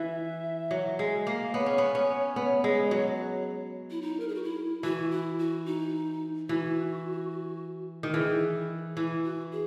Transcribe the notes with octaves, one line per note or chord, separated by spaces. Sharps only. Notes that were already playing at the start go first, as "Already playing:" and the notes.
Already playing: E3 E5
F#3
G#3
A#3
D#5
B3 C#5
C#4
B3
C#4
B3
G#3
F#3
E4
D#4
A#4
G#4
F#4
E4
E3 F#4
E4
F#4
D#4
E3 F#4
D#3
E3 G#4
E4
E3 E4
F#4
G#4